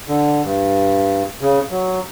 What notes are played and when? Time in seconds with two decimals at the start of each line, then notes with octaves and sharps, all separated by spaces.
0.09 D3
0.44 G2
1.41 C#3
1.71 F#3